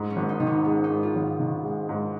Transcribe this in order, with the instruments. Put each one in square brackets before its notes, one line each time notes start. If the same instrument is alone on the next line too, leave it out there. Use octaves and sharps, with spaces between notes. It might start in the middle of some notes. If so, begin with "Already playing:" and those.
Already playing: [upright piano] G#2
[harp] C#4
[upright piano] G#1
[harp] D#4
[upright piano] D#3 [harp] D#4
[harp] C#4
[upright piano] G#3 [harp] C#4
[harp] D#4
[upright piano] G#2
[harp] F4
[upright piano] G#1
D#3
G#3
G#2